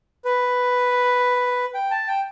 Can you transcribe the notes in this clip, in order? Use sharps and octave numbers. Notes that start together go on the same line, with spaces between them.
B4
G5
A5
G5